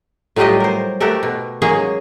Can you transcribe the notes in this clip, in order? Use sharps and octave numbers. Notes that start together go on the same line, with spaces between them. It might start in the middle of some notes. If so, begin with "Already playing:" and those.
A2 F#3 G3 F4 G4 D#5
A#4 C5
A3 F#4 G4 A4 A#4
B2
F#3 G#3 A#3 C#4 G#4